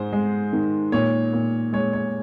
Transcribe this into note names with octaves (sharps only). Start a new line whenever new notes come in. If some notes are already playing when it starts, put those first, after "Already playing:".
Already playing: G#2 G#3 C5
G#3
D#3
A#2 C#5
A#2
G#3 C#5
C#5